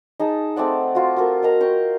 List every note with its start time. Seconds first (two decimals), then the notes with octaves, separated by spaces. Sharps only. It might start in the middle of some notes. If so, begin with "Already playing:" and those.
0.20 D#4 G#4 A5 D#6
0.56 A3 C4 D5 F#5
0.95 F4 F#4
1.16 F4 F#4 A4 A#4
1.42 A#4 D#5 A#5
1.60 G5 A#5 C#6